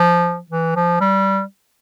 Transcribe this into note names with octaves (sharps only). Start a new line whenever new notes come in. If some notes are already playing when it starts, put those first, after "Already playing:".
Already playing: F3
E3
F3
G3